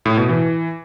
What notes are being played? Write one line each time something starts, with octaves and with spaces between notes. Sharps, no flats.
A2
B2
E3